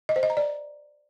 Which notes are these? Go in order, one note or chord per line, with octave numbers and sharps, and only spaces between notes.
D#5
C5
D#5
A#5
D5